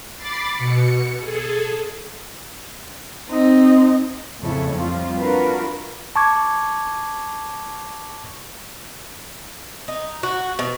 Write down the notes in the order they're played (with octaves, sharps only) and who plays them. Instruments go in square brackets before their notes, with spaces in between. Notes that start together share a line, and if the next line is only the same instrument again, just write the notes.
[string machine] B5 D6 A6 C7
B2 C#7
G#4 A4
[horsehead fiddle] C4 D#4
[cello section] F2 A2 C#3 E4 A4 C#5
F2 G3 C4 F4
D4 F4 F#4 A#4 B4
[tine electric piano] A5 C#6 D6 G#6
[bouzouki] D#4
F#4
B2